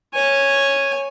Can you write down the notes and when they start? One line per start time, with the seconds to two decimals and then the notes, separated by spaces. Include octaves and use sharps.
0.14 C#5 G#5